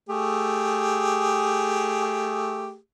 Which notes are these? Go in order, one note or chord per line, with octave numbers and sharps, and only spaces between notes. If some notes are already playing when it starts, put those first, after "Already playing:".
A3 G4 G#4